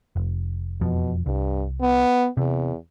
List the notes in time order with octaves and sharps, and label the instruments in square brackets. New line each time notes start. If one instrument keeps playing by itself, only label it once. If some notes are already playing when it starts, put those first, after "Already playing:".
[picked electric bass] F1
[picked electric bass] E1 F2 F3 [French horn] B2
[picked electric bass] C2 [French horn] G2
[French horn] B3
[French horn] E2 [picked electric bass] C3